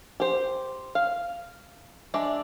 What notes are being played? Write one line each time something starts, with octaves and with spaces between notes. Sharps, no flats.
G4 C5
F5
G#3 D4 D5 E5